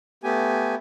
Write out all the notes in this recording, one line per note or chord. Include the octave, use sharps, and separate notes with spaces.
A3 B3 G4 G#5